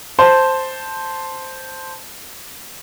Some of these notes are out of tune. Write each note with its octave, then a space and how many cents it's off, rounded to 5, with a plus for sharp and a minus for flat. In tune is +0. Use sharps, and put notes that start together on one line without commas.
C5 +0 A5 +0